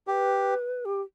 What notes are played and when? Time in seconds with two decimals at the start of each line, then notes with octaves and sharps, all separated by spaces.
0.07 G4 B4
0.85 G4